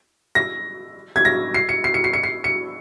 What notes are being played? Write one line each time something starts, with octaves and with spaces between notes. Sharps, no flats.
A#6
G#6
A#6
C7
C#7
C7
C#7
C7
C#7
C7
C#7